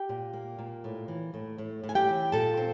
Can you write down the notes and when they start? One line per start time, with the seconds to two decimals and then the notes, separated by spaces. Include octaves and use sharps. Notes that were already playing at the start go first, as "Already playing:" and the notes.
Already playing: G4 G5
0.09 A#2
0.34 A#3
0.59 A#2
0.84 A2
1.08 E3
1.34 A2
1.58 A2
1.84 A2
1.89 G#5
1.95 G4 G5
2.08 E3
2.32 A#2 A4 A5
2.57 C4